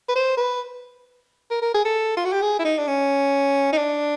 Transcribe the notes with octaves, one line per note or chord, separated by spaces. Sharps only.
B4
C5
B4
A#4
A#4
G#4
A4
F4
F#4
G4
G#4
E4
D#4
D4
C#4
D#4
D4